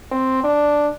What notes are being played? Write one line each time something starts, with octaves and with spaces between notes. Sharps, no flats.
C4
D4